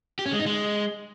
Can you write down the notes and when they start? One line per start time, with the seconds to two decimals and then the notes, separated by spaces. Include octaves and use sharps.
0.19 G4
0.26 C#4
0.33 G#3
0.39 D#4
0.46 G#3